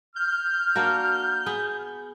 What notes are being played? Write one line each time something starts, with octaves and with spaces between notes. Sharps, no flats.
F6 G6
A#3 D4 F#4
B3 G#4